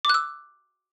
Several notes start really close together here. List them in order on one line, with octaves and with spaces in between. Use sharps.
D6 F#6 E6